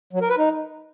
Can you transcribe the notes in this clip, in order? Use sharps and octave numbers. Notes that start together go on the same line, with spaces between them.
F#3
A#4
B4
D#4